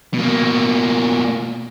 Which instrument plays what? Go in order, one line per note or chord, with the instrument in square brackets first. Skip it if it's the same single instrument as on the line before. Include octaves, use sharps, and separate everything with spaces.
[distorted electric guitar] B2 A#3